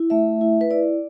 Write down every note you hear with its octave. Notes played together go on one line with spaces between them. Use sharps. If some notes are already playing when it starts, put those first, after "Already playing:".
Already playing: E4
A3 E5
E4
B4
E4 D5